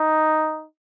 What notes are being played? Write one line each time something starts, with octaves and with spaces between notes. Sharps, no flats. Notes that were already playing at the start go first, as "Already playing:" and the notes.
Already playing: D#4